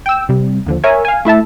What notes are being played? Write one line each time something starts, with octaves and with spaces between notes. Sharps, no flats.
G5 E6
C3 G3
D#2 D3 F3
A#4 C#5 E5 G#5
F5 G#5
A3 E4 E5 A5